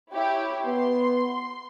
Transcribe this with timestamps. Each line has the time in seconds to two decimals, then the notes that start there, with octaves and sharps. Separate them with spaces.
0.12 E4 G4 C#5
0.65 B3 C6